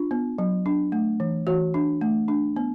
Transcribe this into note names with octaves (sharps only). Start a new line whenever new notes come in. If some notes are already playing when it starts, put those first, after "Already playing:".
Already playing: D4 F4
B3
F#3
D4
A3
E3
E3 F#4
D4
A3
D4
B3